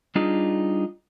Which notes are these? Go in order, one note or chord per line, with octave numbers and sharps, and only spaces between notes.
G3 D4 D#4 F4 G#4